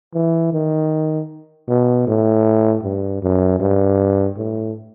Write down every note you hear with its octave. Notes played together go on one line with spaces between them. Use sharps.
E3
D#3
B2
A2
G2
F#2
G2
A2